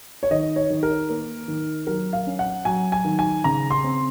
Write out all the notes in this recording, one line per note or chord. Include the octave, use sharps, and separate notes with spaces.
C#5
D#3 D#5
C#5
D#3
A#4
A#3
D#3
F#3 A#4
F5
C#4
F#5
F#3 G#5
G#5
D#3
G#5
C#3 A#5
C6
C4